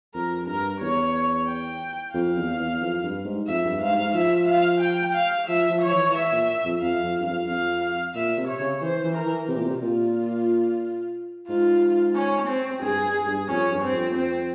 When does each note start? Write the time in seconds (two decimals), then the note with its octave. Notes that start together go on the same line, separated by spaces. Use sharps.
0.14 F2 A#4
0.47 G2 A#4
0.81 E2 C#5
1.47 G5
2.14 F2 F5
2.37 E2
2.59 E2
2.81 F2
3.03 G2
3.25 G#2
3.47 F2 E5
3.64 G2
3.81 G#2 F5
3.97 G#2
4.14 F3 E5
4.48 F5
4.80 G5
5.15 F5
5.48 F3 E5
5.69 F3
5.82 F3 C#5
5.92 E3
6.14 E5
6.32 A#2
6.65 F2
6.81 F2 F5
7.03 F2
7.20 G2
7.26 F2
7.47 F2 F5
8.15 A#2 E5
8.38 C3
8.48 C#5
8.60 C#3
8.81 E3 C5
9.04 E3
9.16 A#4
9.25 E3
9.48 C3 G4
9.56 A#2
9.63 C3
9.81 A#2 F4
11.48 G#2 F4
12.15 C#4
12.48 C4
12.82 G2 G#4
13.04 G2
13.26 G2
13.48 F2 C#4
13.71 G2
13.83 C4
13.93 F2
14.15 C4